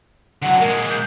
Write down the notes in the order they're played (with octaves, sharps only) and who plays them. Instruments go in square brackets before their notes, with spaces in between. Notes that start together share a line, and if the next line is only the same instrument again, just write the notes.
[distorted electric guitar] D3 F#3 [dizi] F#5
[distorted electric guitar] A#2 G#3 [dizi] A#4
[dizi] G6